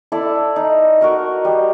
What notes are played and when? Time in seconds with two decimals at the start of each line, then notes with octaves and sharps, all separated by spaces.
0.12 E4 A4 D5
0.56 D#4
1.01 F#4 A#4 D#5
1.45 G3